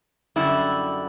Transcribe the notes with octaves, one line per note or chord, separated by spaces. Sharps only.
F#2 D3 G3 E4